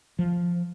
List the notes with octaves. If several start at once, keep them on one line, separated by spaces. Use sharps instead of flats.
F3